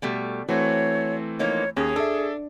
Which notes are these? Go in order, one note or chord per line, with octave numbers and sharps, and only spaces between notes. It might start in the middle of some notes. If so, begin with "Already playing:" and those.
B2 G3 A3
E3 A3 C4 F#4 C#5
F3 A#3 D#4 C#5
D#2 C#4 G#4
D4 A4 E5